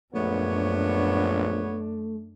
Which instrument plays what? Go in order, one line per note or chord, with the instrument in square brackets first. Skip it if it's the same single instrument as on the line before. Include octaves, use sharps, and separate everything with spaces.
[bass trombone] A#1 [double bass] F#2 D4 [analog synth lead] A3 [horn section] B3 C#5